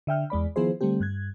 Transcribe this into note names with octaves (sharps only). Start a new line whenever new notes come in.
D3 E5 G5 F6
E2 G#3 D5 B5
D#3 F3 B3 E4 G#4 C5
D3 G3 A3 C4 G4
G2 F#6 G#6